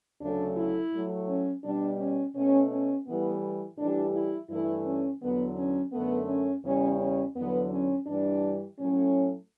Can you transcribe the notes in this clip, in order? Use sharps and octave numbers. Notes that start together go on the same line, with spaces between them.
D2 C#3 F#3 A3 D4
E4
A2 F#3 A3
C#4
B2 G3 D4
C#4
B2 A3 C#4
C#4
A2 E3 G3 B3
A2 E3 G3 D4
E4
G2 E3 A3 E4
C#4
E2 D3 F#3 B3
C#4
F#2 D3 A3 B3
C#4
E2 C#3 G3 C#4
C#4
E2 D3 F#3 B3
C#4
G2 E3 G3 D4
A2 F#3 A3 C#4